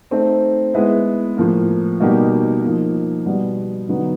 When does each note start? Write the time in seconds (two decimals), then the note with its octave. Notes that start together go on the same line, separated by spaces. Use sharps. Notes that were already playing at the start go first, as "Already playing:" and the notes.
0.11 A3 C4 D#4
0.74 G#3 B3 E4
1.37 A2 F3 A#3
2.00 B2 G3 A#3 D#4 G4
2.63 F3 A#3 D#4
3.26 B2 G3 B3
3.89 D3 F#3 B3 D#4